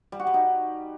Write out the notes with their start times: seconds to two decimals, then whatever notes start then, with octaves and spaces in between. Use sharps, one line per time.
0.12 G3
0.20 F#4
0.27 G3
0.34 D#4